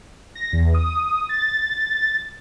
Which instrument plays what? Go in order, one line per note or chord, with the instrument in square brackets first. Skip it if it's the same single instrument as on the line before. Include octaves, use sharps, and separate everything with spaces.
[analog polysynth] A#6
E2
D#6
A6